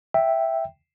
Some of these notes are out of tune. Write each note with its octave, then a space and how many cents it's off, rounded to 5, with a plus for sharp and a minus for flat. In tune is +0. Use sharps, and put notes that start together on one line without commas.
E5 +0 G5 +0